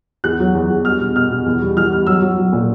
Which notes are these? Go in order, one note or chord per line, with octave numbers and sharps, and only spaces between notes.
E2 F#6
F#3
E2
E2
G3 F6
B2
B2 F6
B2
E2
G3
E3 F6
G3
F#3 E6
F#3
F#3
A#2